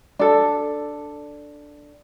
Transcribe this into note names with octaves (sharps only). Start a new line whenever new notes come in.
D4 A4